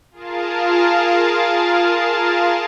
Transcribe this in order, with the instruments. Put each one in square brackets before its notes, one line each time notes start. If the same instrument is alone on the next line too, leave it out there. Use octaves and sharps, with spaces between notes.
[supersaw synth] F4 G#4 A#4 F5 A5